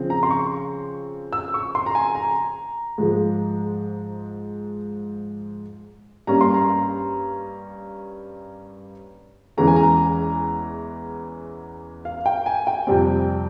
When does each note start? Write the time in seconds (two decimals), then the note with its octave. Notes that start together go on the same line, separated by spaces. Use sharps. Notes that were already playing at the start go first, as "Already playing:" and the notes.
Already playing: C#3 F3 C4
0.10 A#5
0.23 C6
0.31 C#6
1.33 E6
1.54 C#6
1.75 C6
1.86 A#5
1.95 G#5
2.15 A#5
2.98 G#2 F3 G#3
6.27 G2 G3 A#3 C#4 A#5
6.41 C6
6.54 A#5
9.57 E2 E3 G#3 C#4 A#5
9.68 G#5
9.76 A#5
12.05 F5
12.26 G5
12.46 G#5
12.67 G5
12.87 F2 C3 G3 C4